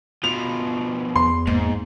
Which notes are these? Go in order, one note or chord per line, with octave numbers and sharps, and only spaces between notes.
B2 F3 F7
E2 C6
G#2 A#3